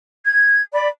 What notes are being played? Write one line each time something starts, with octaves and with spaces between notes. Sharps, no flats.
G#6
D5 B5